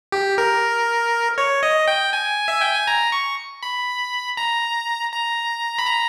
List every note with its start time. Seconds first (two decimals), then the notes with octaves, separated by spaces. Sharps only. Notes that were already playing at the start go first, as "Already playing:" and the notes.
0.12 G4
0.38 A#4
1.38 C#5
1.63 D#5
1.88 G5
2.13 G#5
2.48 E5
2.61 G5
2.74 G#5
2.87 A#5
3.12 C#6
3.63 B5
4.37 A#5
5.12 A#5
5.78 B5
5.87 A#5